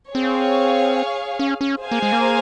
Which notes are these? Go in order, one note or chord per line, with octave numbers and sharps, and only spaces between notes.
C4 G#4 C#5 F5
C#4
C#4
G#4 C5 F5 G#5
A#3
G#3
A#3